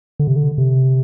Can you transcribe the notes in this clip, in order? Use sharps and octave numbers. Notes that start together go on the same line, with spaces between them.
D3
C3
D3
C3